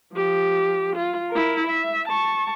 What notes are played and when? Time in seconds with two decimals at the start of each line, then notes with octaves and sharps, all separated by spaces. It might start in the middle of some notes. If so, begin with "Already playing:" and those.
0.14 F3 G4
0.96 F4
1.31 E4 A#4
1.68 E5
2.08 A5 C#6